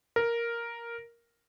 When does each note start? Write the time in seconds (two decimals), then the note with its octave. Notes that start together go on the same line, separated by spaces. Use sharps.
0.16 A#4